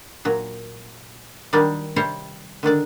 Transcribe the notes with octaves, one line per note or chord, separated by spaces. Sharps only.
A#2 F#3
D#3 F#3 G3 D4 D5
C3 G3 C5 C#5
D3 D#3 D4 D5